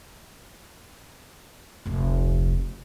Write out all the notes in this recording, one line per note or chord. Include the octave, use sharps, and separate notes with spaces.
F1 D2